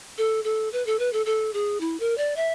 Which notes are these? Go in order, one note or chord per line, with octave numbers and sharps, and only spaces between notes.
A4
A4
B4
A4
B4
A4
A4
G#4
E4
A#4
D5
E5